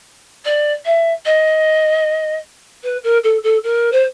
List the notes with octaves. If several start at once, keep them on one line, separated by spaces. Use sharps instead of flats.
D5
E5
D#5
B4
A#4
A4
A4
A#4
C5